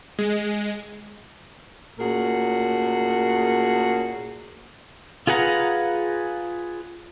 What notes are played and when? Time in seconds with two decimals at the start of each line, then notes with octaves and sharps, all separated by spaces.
0.19 G#3
1.99 A#2 A3 C#4 F#4 G#4 A#4
5.27 F4 G#4 B4 F#5 A#5